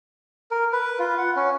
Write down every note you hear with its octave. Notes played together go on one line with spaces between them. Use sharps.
A#4
B4
F4
F#5
C#4